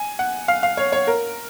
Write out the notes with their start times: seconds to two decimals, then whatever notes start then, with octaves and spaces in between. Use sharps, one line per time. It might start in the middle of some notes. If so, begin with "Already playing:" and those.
Already playing: G#5
0.19 F#5
0.48 F5
0.63 F5
0.77 C#5
0.92 C#5
1.07 A#4